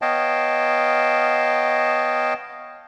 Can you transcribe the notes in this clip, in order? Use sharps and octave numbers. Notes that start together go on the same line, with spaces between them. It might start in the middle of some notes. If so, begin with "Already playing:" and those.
B3 C#5 D#5 F5 G5 A5